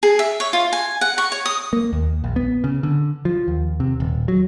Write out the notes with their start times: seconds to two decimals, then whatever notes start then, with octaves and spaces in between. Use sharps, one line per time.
0.03 G#4
0.19 E5
0.40 C#5
0.53 F4
0.73 G#5
1.01 F#5
1.18 C#6
1.32 C#5
1.46 D#6
1.73 A#3
1.93 D#2
2.24 A#1
2.36 B3
2.64 C#3
2.83 D3
3.25 F3
3.48 D#2
3.80 C3
4.00 D#1
4.28 F#3